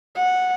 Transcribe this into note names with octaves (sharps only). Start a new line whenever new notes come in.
F#5